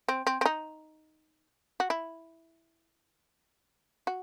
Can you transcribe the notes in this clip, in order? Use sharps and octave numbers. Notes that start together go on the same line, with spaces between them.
C4
C4
C4
D#4
F#4
E4
F#4